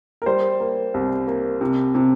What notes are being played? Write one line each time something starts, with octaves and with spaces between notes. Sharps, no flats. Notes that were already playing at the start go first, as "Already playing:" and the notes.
A#4
G3 C5
A#3
C2
A#3
C3
C3